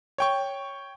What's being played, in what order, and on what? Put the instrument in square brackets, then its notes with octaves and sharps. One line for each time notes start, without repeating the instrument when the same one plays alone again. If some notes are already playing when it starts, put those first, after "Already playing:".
[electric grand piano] C#5 G5 C#6